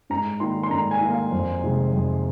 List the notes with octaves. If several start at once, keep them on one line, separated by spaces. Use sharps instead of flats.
G#2 A#5
D#3 A#3 C6
C6
G#2 A#5
G#5
D#3 A#3
F5
F2
C3 D#3 G#3
F2